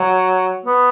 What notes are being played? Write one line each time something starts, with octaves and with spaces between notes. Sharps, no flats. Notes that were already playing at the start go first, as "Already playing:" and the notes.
Already playing: F#3
B3